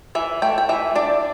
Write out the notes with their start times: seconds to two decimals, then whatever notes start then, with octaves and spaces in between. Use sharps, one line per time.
0.15 E3 E5
0.42 A3 G5
0.58 G5
0.69 E3 E5
0.95 D4 D5